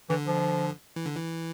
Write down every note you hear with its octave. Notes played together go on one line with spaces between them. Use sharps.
D3 E3
F3
E3
D3
E3